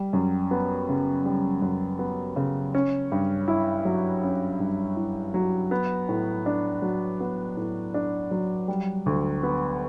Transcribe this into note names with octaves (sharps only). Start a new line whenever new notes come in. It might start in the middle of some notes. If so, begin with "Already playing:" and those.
Already playing: G3
F#2
B3
C#3
G3
F#2
B3
C#3
C#4
G2
E4
F#3
C#4
G2
E4
F#3
B3
A2
D4
F#3
B3
A2
D4
F#3
G3
D2
B3